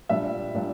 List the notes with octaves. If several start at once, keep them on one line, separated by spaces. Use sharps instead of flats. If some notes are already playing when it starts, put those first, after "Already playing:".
A#2 G3 D4 E5
A#2 G3 D4